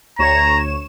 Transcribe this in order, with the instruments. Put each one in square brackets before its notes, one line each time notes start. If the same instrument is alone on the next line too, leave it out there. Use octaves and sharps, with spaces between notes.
[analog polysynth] D2 C#5 E7 [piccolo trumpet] A#5